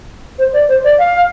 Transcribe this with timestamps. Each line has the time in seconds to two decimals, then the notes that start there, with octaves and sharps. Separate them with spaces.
0.38 C5
0.53 D5
0.68 C5
0.84 D5
0.99 F5